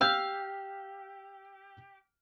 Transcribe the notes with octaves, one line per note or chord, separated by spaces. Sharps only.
G4 F5 E6 F6 G6